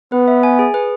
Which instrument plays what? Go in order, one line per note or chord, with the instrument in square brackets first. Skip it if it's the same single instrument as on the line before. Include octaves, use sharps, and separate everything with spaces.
[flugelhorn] B3 [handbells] B4
[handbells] E5
G#5
G#4
B4